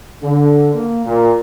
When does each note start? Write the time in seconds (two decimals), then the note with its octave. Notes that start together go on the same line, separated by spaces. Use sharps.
0.23 D3
0.74 A#3
1.06 A#2